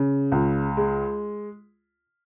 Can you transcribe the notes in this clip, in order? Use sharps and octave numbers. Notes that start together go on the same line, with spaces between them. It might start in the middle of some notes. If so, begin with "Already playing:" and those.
Already playing: C#3
C#2
G#3